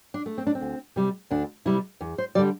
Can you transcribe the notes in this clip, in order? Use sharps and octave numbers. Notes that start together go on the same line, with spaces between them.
D4
A3
C4
D4
C4
D2
C3 G3
D2 D4
C3 G3 E4
E2
C5
D3 G3 D5